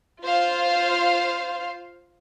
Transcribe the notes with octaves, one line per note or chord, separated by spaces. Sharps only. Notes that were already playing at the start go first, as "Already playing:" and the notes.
F4 C5 F5